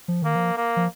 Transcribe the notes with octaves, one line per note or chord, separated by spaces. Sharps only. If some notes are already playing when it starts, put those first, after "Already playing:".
F3
D#3 A#3
F3
A#3
F3